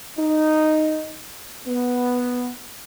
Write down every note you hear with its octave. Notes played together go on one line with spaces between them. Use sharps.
D#4
B3